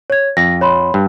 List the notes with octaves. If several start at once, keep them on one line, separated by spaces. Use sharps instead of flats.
C#5 G#6
F2 A#6
C#5 B5 C6
G2